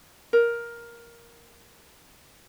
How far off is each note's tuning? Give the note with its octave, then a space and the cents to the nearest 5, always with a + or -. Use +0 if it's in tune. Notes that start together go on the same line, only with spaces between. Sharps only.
A#4 +10